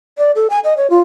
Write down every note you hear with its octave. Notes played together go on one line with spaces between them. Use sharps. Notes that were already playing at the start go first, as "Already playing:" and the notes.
D5
A4
G#5
D#5
C#5
F4